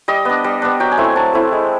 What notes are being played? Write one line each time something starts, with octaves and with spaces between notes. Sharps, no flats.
G3 D#5
B3 D4
G3
B3 D4
F#3 G5
G#5
A3 C4 E4
G#5
F#3 A5
A3 C4 E4
G#3